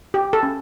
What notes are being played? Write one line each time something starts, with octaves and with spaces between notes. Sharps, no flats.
G4
A4
C#4